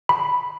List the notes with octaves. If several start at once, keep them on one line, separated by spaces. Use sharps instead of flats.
B5